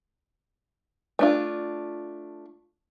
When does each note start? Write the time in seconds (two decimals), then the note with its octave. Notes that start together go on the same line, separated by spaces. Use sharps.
1.19 A3 D4 F4